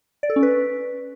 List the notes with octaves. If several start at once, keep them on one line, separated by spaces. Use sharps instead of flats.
D5
A4
C#4
B4